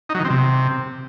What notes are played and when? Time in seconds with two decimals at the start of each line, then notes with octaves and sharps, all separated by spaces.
0.09 D#4
0.14 F#3
0.20 D#3
0.25 C4
0.30 C3